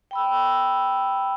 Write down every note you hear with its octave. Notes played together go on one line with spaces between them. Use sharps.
G5 B5 E6